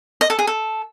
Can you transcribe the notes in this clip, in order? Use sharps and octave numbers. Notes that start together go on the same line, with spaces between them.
D#5
A4
G#4
A4